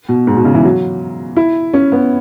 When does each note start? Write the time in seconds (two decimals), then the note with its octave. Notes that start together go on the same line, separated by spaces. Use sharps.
0.09 B2
0.27 G#2
0.36 B2
0.45 C#3
0.54 E3
0.64 F#3
1.37 E4
1.74 C#4
1.92 B3